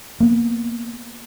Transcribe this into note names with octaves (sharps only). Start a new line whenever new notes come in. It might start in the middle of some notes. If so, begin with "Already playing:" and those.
A#3 B3